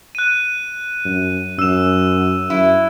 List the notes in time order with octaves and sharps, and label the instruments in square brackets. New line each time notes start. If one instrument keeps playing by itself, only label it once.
[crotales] F#6 D#7
[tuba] F#2
[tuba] F#2 [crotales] E6 E7
[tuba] F#2 [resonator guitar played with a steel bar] E4